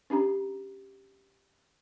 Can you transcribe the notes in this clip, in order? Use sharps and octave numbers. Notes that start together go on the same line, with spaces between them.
C#4 D4 G4 A#5